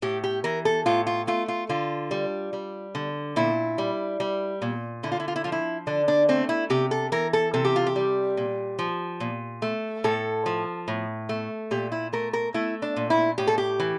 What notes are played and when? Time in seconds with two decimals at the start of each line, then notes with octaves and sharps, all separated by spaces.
0.02 A2 G4
0.24 G4
0.44 E3 A#4
0.65 A4
0.86 A2 F4
1.07 F4
1.27 A3 F4
1.48 F4
1.69 D3 F4
2.11 G3
2.53 G3
2.95 D3
3.36 A#2 E4
3.78 G3
4.20 G3
4.62 A#2
5.03 D3 E4
5.12 F4
5.20 E4
5.28 F4
5.36 E4
5.44 F3 F4
5.52 E4
5.87 D3 D4
6.08 D4
6.29 A3 C4
6.49 E4
6.70 C3 G4
6.91 A4
7.12 E3 A#4
7.33 A4
7.54 C3 A4
7.65 G4
7.76 F4
7.87 G4
7.96 G3
8.37 A#2
8.79 F3
9.20 A#2
9.62 A3
10.04 A2 A4
10.46 F3
10.88 A2
11.29 A3
11.71 A#2 G4
11.92 E4
12.13 A3 A#4
12.33 A#4
12.54 A3 E4
12.82 D4
12.96 A#2
13.10 E4
13.38 A2 G4
13.47 A4
13.58 G4
13.80 E3